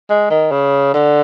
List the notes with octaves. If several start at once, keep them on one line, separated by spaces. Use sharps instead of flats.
G#3
D#3
C#3
D3